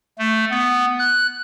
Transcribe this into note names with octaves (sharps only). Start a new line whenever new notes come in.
A3
B3
F#6